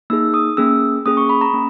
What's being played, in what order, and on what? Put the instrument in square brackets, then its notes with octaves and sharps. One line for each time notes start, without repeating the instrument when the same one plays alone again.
[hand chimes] A#3 D#4 G#4 E6
D#6
A#3 C#4 G#4 E6
A#3 C#4 G#4 D#6
C#6
B5
A#5
A#3 C#4